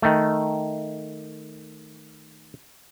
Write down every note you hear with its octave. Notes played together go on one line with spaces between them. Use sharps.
D#3 A3